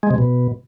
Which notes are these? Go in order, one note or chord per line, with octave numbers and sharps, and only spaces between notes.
G#3
C3
B2